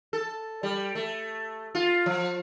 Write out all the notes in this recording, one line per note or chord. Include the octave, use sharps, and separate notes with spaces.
A4
G3
A3
F4
F3